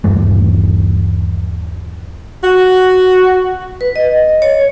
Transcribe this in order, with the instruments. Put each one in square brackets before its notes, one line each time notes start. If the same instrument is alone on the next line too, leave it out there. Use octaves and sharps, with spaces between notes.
[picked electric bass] D#1 G2 E3 A3
[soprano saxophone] F#4
[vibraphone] B4
D#5
C#5